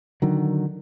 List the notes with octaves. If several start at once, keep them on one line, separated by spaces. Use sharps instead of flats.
D3 D#3 F#3